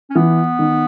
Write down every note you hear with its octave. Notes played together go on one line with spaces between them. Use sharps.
C#4
E3 B3
D#3